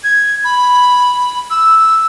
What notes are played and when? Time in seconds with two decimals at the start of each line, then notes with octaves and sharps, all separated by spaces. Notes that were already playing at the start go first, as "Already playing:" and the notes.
0.03 G#6
0.44 B5
1.50 E6